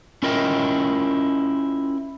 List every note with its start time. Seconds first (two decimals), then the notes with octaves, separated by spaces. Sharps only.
0.23 C#4 E4 F4 A#4 D#5 G5